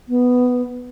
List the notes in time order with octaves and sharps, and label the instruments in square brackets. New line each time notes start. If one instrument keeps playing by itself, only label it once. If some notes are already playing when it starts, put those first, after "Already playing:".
[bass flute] B3